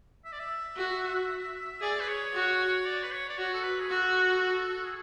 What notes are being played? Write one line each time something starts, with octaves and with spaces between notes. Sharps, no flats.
E5
D5
E5
F#4
G#4 D5
B4
C#5
F#4
D5
B4
C#5
D5
F#4 C#5
A4
B4
G#4
F#4 A4
G#4